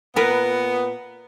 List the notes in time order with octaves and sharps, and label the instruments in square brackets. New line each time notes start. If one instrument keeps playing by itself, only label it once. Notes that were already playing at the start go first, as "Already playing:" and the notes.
[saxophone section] A#2 B3 [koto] A#4 B4